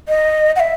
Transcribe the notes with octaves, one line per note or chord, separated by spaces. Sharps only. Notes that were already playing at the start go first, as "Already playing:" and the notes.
D#5
F#5
E5